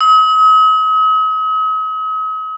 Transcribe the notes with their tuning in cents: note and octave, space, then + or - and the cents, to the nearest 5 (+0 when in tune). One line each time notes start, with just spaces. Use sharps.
D#6 +45